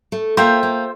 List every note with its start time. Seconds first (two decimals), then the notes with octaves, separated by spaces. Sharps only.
0.12 A3
0.37 A#3 F4 C5 E5 G5
0.63 A#3